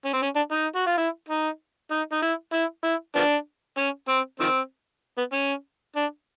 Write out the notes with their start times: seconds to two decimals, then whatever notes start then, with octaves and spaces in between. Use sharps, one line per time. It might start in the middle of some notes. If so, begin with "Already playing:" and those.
0.05 C#4
0.13 C4
0.22 C#4
0.36 D4
0.52 D#4
0.76 F#4
0.87 F4
0.98 E4
1.29 D#4
1.91 D#4
2.13 D#4
2.23 E4
2.54 E4
2.84 E4
3.16 F3 B3 D4
3.78 C#4
4.09 C4
4.40 D#3 F3 C4
5.18 B3
5.33 C#4
5.96 D4